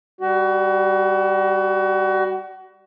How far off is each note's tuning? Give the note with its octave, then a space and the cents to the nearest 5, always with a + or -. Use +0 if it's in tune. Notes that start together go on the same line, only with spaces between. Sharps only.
G3 +0 F#4 +30